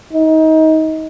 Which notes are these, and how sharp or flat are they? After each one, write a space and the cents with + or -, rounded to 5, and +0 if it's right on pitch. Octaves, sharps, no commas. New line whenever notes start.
D#4 +25